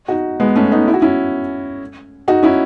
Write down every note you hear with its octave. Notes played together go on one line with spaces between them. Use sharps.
D#4 F#4
G#3 B3
A3 C#4
B3 D#4
E4
F#4
C#4 E4
D#4 F#4
C#4 E4